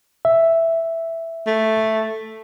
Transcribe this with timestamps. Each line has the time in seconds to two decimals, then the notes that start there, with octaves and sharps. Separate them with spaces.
0.25 E5
1.47 A3